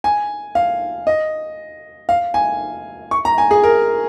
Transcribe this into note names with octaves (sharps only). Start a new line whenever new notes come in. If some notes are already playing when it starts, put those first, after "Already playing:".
G#5
F5
D#5
F5
G#5
C#6
A#5
G#5
G#4
A#4